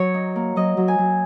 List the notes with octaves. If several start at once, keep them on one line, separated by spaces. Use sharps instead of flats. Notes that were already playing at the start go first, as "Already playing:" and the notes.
Already playing: F#3 C#5
D#4
A#3
F#3 D#5
F#3
G#5
F#3